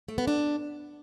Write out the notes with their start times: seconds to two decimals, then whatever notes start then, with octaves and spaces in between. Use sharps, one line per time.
0.08 A3
0.18 B3
0.27 D4